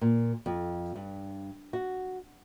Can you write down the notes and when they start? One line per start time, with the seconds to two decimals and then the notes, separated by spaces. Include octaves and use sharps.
0.01 A#2
0.46 F2
0.96 G2
1.73 F#4